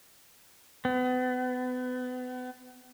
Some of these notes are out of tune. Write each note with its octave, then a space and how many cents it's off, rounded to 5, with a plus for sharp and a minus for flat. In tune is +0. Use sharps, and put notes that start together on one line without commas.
B3 +35